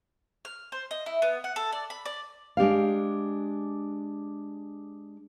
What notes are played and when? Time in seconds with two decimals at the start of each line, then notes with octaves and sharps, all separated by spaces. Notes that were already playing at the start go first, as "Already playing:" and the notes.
0.45 F6
0.72 C5
0.91 D#5
1.06 E4
1.22 B3
1.44 F#5
1.56 A4
1.72 D5
1.90 B5
2.06 D5
2.57 G#3 D4 G4 F5